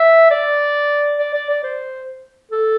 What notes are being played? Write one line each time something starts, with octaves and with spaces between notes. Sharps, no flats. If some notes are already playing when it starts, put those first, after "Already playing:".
Already playing: E5
D5
D5
D5
D5
C5
A4